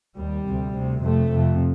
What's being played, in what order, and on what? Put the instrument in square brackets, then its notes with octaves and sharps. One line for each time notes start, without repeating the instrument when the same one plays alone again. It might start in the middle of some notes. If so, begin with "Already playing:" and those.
[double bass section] D#2 G3
D2 C3
D2 C3
F2 C3 A3
F2 C3